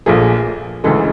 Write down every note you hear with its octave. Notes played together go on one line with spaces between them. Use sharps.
A#1 A#2 F3 A3 G#4
D2 C#3 E3 G#3 A4